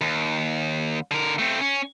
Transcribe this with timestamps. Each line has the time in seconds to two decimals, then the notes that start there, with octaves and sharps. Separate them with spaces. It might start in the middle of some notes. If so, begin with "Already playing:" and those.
0.01 D#2
1.11 D3 A#4
1.39 A3 C4
1.61 C#4